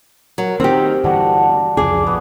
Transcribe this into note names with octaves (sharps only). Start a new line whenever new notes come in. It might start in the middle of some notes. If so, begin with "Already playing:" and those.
F#3 A#4
D#3 C4 G4
G2 D3 E3 D4 F#4 A#4 F#5
C2 F2 C#3 G#4 D6
A#1 F2 B3